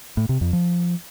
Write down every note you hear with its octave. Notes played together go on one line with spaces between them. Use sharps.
A2
C3
F2
F3